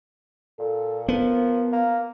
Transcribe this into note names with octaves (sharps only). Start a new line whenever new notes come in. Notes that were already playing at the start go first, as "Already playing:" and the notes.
A#2 A4
F3 B3 A#4
A#3